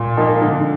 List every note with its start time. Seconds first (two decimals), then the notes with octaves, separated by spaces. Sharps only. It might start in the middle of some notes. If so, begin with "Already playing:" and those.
Already playing: A#2
0.17 F3 A#3 D#4
0.42 D3